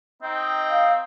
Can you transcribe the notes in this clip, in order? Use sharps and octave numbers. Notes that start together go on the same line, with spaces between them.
C4 D#4 D#5 G5
F5